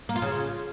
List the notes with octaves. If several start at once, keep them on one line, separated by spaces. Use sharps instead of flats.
A#3
F4
C#3